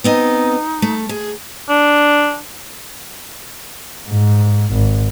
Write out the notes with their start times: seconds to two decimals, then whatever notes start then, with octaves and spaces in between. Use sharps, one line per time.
0.04 B3 C4 D#4 D#5
0.82 A3
1.09 G#4
1.69 D4
4.08 G#2
4.73 G#1